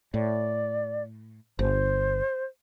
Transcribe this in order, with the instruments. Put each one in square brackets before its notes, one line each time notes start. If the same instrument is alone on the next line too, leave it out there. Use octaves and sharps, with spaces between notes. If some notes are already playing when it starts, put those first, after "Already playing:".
[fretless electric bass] A2 [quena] D5
[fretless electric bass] G1 [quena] C5